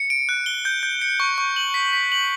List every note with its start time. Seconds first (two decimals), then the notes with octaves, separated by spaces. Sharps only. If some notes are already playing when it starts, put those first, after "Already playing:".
Already playing: C#7
0.10 D7
0.29 F#6
0.46 G7
0.65 G6
0.83 G6
1.02 C#7
1.20 C#6
1.38 C#6
1.56 F#7
1.74 B6
1.93 B6
2.12 F#7